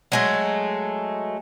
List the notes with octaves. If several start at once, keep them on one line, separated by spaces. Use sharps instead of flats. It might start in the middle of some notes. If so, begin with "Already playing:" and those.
F#3 G#3 A3